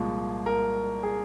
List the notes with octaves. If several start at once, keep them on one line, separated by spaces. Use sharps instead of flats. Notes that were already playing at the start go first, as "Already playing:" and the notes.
Already playing: C2 A#2 F3 G#3
A#4
G#4